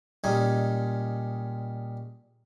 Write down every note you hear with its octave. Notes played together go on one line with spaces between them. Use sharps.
A#2 G3 G#3 C#4 D#4 G#5